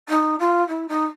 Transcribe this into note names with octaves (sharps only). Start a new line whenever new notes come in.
D#4
F4
E4
D#4